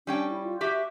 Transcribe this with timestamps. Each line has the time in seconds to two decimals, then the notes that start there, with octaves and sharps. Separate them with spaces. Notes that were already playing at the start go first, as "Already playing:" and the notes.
0.07 G3 C#4 D4 G5
0.30 E4
0.44 F4
0.61 F#4 G4 E5